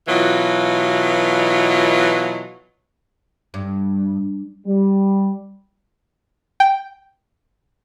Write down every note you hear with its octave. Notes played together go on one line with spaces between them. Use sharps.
B2 E3 F#3 F4
G2
G3
G5